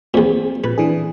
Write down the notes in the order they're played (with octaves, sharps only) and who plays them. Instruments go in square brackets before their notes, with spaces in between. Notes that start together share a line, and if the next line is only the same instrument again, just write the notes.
[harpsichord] E2 A#2 [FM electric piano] C4
[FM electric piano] A#2 [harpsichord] B4
[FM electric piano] E3 D4 G#4